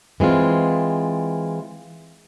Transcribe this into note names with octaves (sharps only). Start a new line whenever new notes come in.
E3 G#3 C4 F4